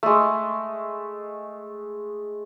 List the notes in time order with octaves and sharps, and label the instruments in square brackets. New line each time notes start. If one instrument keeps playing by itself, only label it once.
[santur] G#3 A3